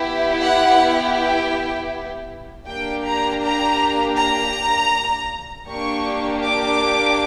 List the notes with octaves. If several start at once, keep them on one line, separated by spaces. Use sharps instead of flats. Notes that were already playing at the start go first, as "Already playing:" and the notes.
Already playing: B3 E4 G4
F#5
G5
A#3 D4 G4 G5
A#5
A#5
A#5
A#3 D4 G4 C#6
D6